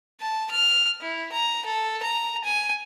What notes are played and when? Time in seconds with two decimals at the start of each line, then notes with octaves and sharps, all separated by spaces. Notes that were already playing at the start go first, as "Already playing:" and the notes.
0.21 A5
0.51 F6
1.01 E4
1.32 A#5
1.66 A4
2.03 A#5
2.44 G#5